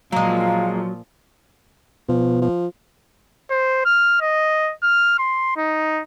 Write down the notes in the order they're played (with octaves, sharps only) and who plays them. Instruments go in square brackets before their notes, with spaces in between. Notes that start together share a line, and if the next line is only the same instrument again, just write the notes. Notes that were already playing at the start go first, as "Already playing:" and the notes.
[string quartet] A#2 F3 [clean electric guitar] F#3 [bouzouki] G#3 A#3 [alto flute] F5
[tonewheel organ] B2 B3 [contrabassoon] F3
[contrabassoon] F3
[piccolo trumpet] C5
F6
D#5
F6
C6
D#4